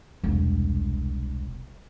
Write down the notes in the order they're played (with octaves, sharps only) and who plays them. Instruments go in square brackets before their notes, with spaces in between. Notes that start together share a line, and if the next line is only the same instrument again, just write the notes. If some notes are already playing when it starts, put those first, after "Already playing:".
[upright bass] E1 C2